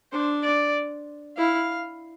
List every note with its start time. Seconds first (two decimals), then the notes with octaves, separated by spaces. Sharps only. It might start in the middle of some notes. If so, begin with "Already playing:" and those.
0.12 D4 C5
0.43 D5
1.37 E4 F5